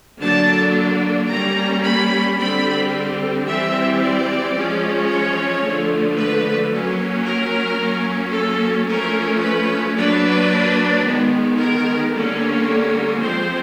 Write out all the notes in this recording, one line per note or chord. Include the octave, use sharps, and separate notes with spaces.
D3 F#3 A#3 D4 A5
G3 A#3 C#4 A#5
B5
D3 G3 C4 B5
E3 G3 C4 E5
D5
F3 G#3 C#4
C#5
D3 F3 A3
B4
F#3 A#3 C#4
A#4
F#3 A#3 C#4
A4
F3 A3 C#4 A#4
B4
F#3 A#3 D4 B4
D#3 G#3 B3
A#4
D3 G3 A#3 C#4
F3 G#3 C4 C5